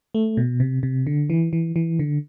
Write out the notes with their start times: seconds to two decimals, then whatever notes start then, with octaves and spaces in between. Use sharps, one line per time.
0.15 A3
0.37 B2
0.60 C3
0.83 C3
1.07 D3
1.30 E3
1.53 E3
1.76 E3
1.99 D3